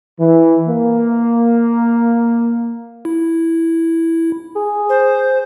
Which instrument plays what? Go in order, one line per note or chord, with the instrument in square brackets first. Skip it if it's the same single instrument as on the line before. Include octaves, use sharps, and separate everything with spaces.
[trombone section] E3
A#3
[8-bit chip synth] E4
[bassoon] G#4
[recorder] C5